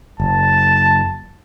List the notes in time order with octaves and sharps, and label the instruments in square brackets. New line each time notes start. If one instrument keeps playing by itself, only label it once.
[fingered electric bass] F#1 [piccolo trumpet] A5